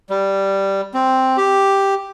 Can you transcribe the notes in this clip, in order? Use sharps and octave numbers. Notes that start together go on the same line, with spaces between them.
G3
C4
G4